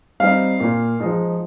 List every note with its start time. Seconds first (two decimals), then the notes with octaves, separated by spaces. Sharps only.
0.20 G3 C4 D#4 F5
0.60 A#2
1.00 F3 G#3 D#4